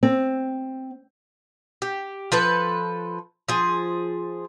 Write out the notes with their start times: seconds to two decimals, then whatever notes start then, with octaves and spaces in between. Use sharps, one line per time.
0.03 C4
1.82 G4
2.32 F3 A4 B4
3.48 F3 G#4